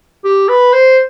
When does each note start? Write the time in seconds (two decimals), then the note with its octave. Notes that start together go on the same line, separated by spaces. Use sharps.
0.24 G4
0.48 B4
0.73 C5